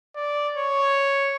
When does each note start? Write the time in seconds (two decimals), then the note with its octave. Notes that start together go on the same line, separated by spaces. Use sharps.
0.16 D5
0.57 C#5